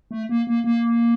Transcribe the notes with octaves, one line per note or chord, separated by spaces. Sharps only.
A3
A#3
A#3
A#3